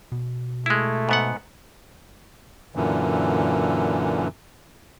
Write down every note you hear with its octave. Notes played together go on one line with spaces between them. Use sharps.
B2
G#3 A3 E4
G#2 B3 F#5
F#2 A#2 D3 E3